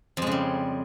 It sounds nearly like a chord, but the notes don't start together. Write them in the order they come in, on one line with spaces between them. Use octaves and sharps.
F2 G#3 C#3 G3